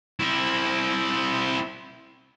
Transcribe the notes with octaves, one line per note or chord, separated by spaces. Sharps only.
C4 E4